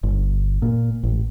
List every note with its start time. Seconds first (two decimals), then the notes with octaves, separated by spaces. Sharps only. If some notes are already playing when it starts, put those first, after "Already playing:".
0.03 G1
0.62 A#2
1.03 A1